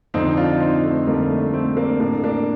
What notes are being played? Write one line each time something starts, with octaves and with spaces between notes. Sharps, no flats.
F2 D3 C4 D#4
D4 F4
C4 D#4
A3 C4
F2 D3 G3 A#3
A3
A3 C4
A#3 D4
A2 A#3 D4
A#3 D4